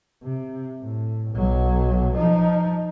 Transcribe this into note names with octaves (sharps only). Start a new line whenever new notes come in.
C3
A2
B1 F#3
F3 D#4